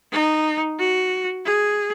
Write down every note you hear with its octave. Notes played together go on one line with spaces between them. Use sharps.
D#4
F#4
G#4